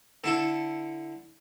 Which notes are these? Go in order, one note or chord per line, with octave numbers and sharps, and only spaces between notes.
D3 E4 A4